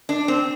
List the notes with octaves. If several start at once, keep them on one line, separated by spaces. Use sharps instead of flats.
D4
C4